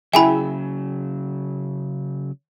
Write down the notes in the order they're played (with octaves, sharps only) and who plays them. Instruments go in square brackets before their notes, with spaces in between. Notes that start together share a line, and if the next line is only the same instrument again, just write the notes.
[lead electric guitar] C#3 F#3 [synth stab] E4 G#4 E5 [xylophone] G5 G#5 B5